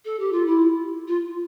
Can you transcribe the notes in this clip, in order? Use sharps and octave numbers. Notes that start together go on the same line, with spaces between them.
A4
G4
F4
E4
F4